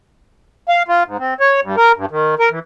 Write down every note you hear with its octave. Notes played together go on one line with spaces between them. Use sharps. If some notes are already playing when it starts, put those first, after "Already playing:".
F5
F4
G#2
C4
C#5
G2
A#4
G2
D#3
A#4
E3